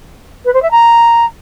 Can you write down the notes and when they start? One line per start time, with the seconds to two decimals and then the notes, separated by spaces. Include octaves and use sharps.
0.45 B4
0.53 C5
0.62 E5
0.71 A#5